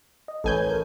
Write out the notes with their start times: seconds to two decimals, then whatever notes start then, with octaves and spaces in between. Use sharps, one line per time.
0.28 D#5
0.44 A1 A4 B4 C#5 G#5 G6
0.70 A#4